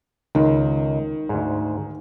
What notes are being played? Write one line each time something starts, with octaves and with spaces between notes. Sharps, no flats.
C#2 D#3
D2 G#2